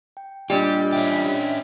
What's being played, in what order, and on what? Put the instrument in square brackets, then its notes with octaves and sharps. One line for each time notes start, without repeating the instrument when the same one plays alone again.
[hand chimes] G5
[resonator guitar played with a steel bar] A#2 G3 [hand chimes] D4 D5 D#5 [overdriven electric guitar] G4
[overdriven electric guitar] C#4 G4 [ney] E5